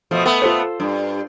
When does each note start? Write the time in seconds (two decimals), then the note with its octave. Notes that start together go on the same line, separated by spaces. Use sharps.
0.11 B2 F3 A3
0.25 A3 B3
0.42 F4 A4 C5
0.80 G2